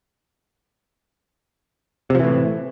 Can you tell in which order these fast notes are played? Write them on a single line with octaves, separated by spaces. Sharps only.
C3 F3 E3 A2